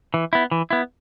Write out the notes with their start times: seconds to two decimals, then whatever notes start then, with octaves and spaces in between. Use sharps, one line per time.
0.14 E3
0.33 B3 E4
0.51 E3
0.70 B3 E4